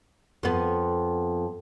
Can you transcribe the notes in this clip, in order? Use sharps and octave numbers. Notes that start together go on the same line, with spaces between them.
F2 B3